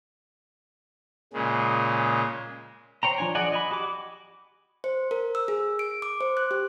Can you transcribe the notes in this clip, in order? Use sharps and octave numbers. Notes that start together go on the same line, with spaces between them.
A#2 C#3 G#3
C5 C#5 G5 A#5
F3 D4 G#5
G#4 D5 D#5 F#5 G#5
D#5 G#5 B5
F#4 G4 D6
C5
A#4
E6
G#4
D7
D6
C5
F#6
G4